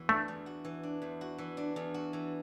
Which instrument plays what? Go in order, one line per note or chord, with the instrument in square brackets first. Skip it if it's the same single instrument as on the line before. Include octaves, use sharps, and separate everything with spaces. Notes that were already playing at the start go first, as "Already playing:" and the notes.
Already playing: [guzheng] E2 E3 F#4
[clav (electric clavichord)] A3 [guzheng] D4
[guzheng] E2
F#4
E3
D4
E2
F#4
E3
D4
E2
F#4
E3